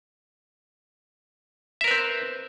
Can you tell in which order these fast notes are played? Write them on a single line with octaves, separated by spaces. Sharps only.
E5 A#4 B4 C4